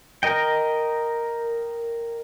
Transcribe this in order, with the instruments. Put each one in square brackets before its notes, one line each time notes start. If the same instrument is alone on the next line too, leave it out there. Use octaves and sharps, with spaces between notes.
[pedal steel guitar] A#4 D#5 G5